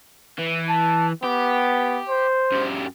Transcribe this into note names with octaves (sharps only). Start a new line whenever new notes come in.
E3
A5
B3 G4
C5
F#2 G4